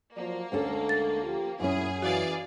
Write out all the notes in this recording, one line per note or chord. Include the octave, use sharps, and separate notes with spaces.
F3 F#3 A#3 D5
D2 G#3 A3 C#4 D4 A4
A6
F3 F4 G4
F#2 A#2 C#4 E4 G#4
E3 F#4 G#4 D5 F5